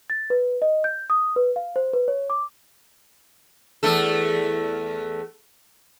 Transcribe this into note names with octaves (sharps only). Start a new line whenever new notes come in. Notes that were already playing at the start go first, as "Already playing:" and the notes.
A6
B4
D#5
G6
D#6
B4
F5
C5
B4
C#5
D6
E2 A3 A4